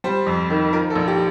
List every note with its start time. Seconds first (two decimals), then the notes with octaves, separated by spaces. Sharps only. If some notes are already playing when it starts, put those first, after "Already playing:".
0.04 G3 C5
0.27 F2
0.50 D#3
0.73 F3 A#4
0.90 A4
0.95 A#1
1.08 G4